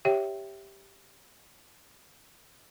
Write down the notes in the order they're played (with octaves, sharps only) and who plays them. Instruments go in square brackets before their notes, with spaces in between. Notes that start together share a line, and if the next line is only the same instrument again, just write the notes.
[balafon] G4 C#5 E5 G5